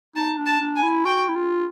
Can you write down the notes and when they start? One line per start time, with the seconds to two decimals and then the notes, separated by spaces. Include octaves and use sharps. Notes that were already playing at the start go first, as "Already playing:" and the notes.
0.16 D#4 A5
0.38 D4
0.46 A5
0.61 D4
0.76 G#5
0.83 E4
1.05 F#4 G5
1.29 E4
1.35 F4